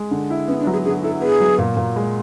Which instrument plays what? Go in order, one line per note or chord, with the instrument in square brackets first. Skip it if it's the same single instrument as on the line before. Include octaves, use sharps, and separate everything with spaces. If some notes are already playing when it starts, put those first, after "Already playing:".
Already playing: [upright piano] G#3
D3
E4
[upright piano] B3 [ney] C#4
[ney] D4
[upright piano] F#3
[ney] G#4
[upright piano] D3 [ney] G#4
[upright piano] E4 [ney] A4
[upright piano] B3 [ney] G#4
[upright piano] F#3
A#2
A#2
G#3